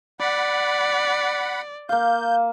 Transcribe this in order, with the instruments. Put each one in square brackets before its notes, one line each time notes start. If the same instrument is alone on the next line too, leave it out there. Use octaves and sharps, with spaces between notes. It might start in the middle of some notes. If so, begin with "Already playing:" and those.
[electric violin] D5 [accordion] F#5 B5
[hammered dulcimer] A#3 F5 [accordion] G6